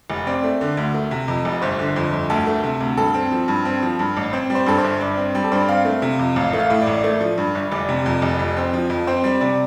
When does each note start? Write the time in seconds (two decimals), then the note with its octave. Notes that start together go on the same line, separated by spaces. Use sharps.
0.10 F1
0.27 C4 D5
0.44 A3
0.61 D3
0.77 D2
0.94 A3
1.11 C3
1.28 F2
1.45 F1
1.62 G1 C5
1.79 D3
1.96 F2
2.12 G1
2.30 D2 A4
2.47 A3
2.63 C3
2.80 D2
2.97 G2 A4
3.14 C4
3.31 F3
3.48 G2
3.65 C4
3.82 F3
3.99 G2
4.17 A1
4.33 C4 C5
4.50 G3
4.55 C5
4.66 G2 A4
4.78 C5
4.84 G1
5.01 G2 D5
5.17 C4
5.35 G3
5.44 A4
5.52 G2 C5
5.60 D5
5.68 C4 F5
5.85 A3
6.02 C3
6.19 F2
6.36 A1 F5
6.53 A3
6.59 F5
6.70 A2
6.82 D5
6.87 A1
7.04 A3 D5
7.21 F3
7.38 G2
7.55 G1
7.72 F1 D5
7.89 C3
8.06 F2
8.22 F1
8.39 F2
8.57 C4
8.73 F3
8.90 F2
9.07 C4 C5
9.24 G3
9.41 C3 D5